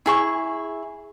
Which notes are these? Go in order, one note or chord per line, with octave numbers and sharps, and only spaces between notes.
E4 G#4 C#6